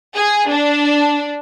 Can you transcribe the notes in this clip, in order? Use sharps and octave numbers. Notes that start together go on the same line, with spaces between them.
G#4
D4